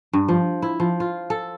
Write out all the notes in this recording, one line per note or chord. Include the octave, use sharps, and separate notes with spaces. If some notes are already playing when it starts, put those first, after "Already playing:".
G2
F3
E4
F3
F4
A4